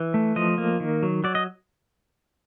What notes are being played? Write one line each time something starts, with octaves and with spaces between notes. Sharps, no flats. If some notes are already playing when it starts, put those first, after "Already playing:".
Already playing: E3
A3
F3 D#5
A#3
D#3
F#3
F#3 D5
D#5